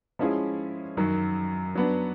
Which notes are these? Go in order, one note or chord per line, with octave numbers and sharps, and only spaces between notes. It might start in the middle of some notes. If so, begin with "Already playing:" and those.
F3 G#3 C#4 E4 G#4
F#2 D#3 F#3
F#3 B3 D4